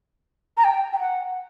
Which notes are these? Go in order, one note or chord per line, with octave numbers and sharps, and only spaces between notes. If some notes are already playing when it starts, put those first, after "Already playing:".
A#5
G5
G5
F#5